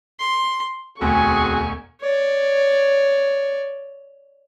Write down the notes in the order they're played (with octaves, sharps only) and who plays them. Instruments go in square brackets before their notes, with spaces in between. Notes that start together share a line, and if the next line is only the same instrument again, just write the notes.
[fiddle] C6
[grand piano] E1 D2 [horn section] C4 F#4 G#4 [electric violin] G#5 C#6
[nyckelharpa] C#5 D5